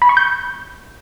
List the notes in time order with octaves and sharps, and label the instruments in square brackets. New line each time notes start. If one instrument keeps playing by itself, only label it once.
[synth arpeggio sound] B5
C#6
G6